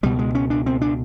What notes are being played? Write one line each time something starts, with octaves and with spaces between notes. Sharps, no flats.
C#2 B2 G3
G#3
C#4
D4
C4
D4